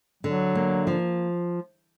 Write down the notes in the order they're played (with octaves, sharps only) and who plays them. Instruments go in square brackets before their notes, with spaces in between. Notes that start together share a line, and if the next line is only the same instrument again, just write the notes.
[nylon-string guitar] D3 [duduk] F#3
[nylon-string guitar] A#3
F3